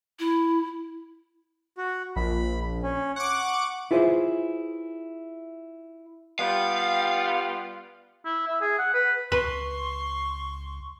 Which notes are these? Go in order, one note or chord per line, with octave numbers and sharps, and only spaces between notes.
E4
F#4
A#1 B5
C#4
F#5 C#6 D6
E4 F4 G#4 B4 C5 E5
G3 B3 F4 F5
E4
E5
G#4
F#5
B4
C#2 B4 C6 C#6